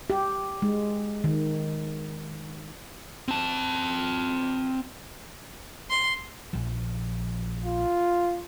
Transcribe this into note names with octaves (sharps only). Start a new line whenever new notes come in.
G4
G#3
D#3
C4 A5
C6
A#1 F3
F4